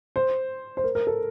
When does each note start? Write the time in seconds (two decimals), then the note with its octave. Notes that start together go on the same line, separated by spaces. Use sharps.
0.16 C5
0.77 C5
0.84 A#4
0.95 A#4
1.07 A4